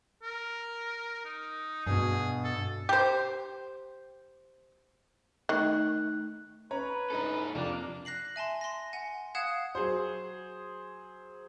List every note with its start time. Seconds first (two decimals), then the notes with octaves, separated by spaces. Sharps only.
0.23 A#4
1.25 D#4
1.87 G2 B2 G#4
2.44 A4
2.89 G4 C5
5.49 D#3 A3 D#4 F#6
6.71 C#4 B4 C#5 A#5
7.10 G#2 D4 D#4 A4 A#5
7.55 F2 C3 F3 A#3 D4
8.05 F#6 A#6 C7 F#7
8.36 E5 G#5 A5 C6
8.61 C6 A#6
8.93 F#5 G#5
9.35 F5 F#5 D#6 F#6 G#6 E7
9.75 F#3 G#4 C5